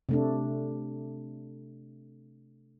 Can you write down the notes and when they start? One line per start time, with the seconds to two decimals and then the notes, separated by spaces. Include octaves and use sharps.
0.09 C3 A3 D4